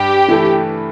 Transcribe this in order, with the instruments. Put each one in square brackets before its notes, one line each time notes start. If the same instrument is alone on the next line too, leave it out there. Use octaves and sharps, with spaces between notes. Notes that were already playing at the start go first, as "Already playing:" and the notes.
Already playing: [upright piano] G2 [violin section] G4
[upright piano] E3 A3 E4 A4